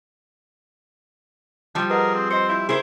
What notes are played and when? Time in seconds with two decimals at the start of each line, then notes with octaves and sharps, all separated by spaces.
1.75 F3 G3 G4 A5
1.90 G#4 A#4 B4 D#5 F#5
2.15 C4
2.31 C5 D#5 C#7
2.49 E4 C6 G6
2.69 E4 G#4 A#4 C5